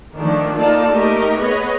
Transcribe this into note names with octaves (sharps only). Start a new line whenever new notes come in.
D#3 F3 A3 D4
A#3 D#4 F4 A4 D5 A5
A3 A#3 D#4 G4 A#4 D#5
B3 G#4 B4 C#5 D#5